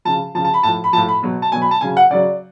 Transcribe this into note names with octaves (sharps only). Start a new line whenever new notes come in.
C#3 F3 A5
C#3 F3 A5
A5
B5
A2 F3 A5
B5
A2 F3 A5
B5
B2 F#3
A5
B2 F#3 G#5
B5
A5
C#3 F#3 G#5
F#5
C#3 F#3 D5